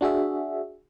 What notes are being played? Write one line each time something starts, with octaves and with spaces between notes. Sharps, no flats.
D4 F#4 G#4 E5